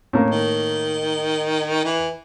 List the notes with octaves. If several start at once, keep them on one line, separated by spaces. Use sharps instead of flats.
A2 A#3
D#3
E3